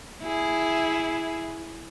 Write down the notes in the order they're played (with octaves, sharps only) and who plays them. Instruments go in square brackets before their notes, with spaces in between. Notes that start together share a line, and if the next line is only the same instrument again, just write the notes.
[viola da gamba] E4 G#4